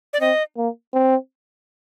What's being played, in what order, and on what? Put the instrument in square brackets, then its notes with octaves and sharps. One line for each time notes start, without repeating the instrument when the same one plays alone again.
[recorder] D5
[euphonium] C4 [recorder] D#5
[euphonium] A#3
C4